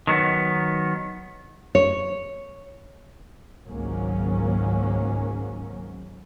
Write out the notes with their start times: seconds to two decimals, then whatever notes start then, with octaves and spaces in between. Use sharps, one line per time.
0.07 D#3 F#3 B3
1.75 C#5
3.68 G#1 C#2 G#2 F#3 A#3 C#4